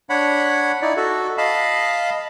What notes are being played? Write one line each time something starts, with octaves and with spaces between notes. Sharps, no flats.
D4 C#5 F#5 B5
D#4 E4 D5
F#4 A4
D#5 F5 A5 B5